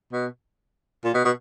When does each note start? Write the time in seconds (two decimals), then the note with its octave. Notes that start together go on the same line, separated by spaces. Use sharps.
0.13 B2
1.04 A#2
1.14 B2
1.25 B2